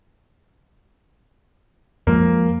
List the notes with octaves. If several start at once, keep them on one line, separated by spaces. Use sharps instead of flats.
F2 F3 G#3 A#3